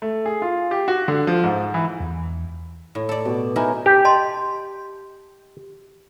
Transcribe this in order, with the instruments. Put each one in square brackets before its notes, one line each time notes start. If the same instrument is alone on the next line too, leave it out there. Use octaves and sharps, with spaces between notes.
[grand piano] A3
G#4
F4
G4
F#4
D3
F3
G#2
E3
[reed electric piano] E2
[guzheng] A2
A4 D5
[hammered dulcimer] B2 D6
[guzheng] B3 E4 A#4 [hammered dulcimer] D#4 G#5
[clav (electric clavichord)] G4
[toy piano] D#5 A5 C6